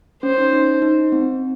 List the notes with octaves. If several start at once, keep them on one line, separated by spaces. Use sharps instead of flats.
C#4 C5
D#4
D#4
D#4
C4